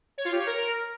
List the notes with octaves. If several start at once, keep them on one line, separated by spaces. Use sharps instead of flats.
C#5
F4
G4
C#5
A#4